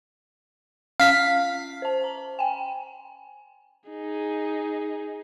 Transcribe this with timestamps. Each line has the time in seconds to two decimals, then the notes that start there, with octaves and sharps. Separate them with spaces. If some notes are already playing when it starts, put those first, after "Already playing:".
1.00 C#4 F5 B6
1.82 C5 A5
2.04 A#5
2.39 G5 G#5
3.90 D#4 G#4